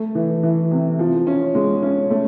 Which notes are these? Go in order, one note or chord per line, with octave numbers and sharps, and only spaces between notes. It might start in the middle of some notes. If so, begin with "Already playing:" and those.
Already playing: A3
E3
E3
C3
F3
C#4
G#3
C#4
A3